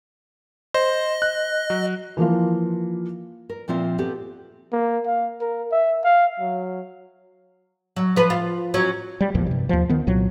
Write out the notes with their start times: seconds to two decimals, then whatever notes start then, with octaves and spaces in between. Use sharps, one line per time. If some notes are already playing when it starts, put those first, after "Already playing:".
0.74 C5 D#5
1.22 F#6
1.70 F#3
2.17 E3 F3 A#3 F4
3.50 A#4
3.68 A#2 F3 C4 F4 E5
3.98 B3 C4 G4 A4
4.73 A#3
5.07 F5
5.41 A#4
5.72 E5
6.05 F5
6.40 F#3
7.96 F#3
8.16 F3 B4
8.30 F4
8.74 F#3 C#4
9.21 G3
9.34 A#1 E2 A#2 F3
9.47 G2 C3
9.69 D#2 F3
9.89 D#3 B3
10.07 C2 A#2 F#3